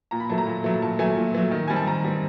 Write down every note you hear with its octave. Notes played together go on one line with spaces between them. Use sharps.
A#2 A#5
B5
F#3 A3 A5
A#5
A#2
F#3 A3
A#2 A5
F#3 A3 G#5
A#2
F#3 A3
D#3
G3 C4 G#5
A5
D#3 A#5
G3 C4